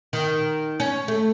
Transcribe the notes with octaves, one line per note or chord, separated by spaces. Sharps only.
D#3
C#4
A3